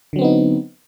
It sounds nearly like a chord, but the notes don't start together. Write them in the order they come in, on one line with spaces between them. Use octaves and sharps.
D3 F#3 C4 B3 D#4